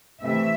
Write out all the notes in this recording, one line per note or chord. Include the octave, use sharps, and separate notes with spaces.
C3 E3 A3 E5